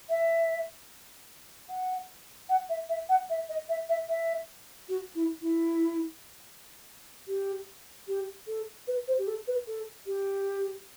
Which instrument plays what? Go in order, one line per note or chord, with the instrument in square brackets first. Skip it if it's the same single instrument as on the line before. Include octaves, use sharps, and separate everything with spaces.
[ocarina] E5
F#5
F#5
E5
E5
F#5
E5
D#5
E5
E5
E5
F#4
E4
E4
G4
G4
A4
B4
C5
G4
A4
B4
A4
G4